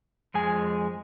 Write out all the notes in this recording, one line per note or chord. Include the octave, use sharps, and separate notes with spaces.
F2 G#3 G#5